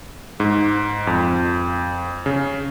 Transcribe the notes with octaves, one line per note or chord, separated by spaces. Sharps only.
G#2
F2
C#3